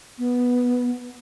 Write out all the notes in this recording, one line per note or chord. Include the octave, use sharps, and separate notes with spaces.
B3